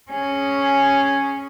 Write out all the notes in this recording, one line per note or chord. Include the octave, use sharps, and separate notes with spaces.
C#4 G#4